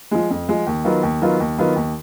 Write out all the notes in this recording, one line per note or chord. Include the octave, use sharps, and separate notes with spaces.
F3 G#3
F2
F3 G#3
D#2
D#3 F#3 B3 F4
D#2
D#3 F#3 B3 F4
D#2
D#3 F#3 B3 F4
D#2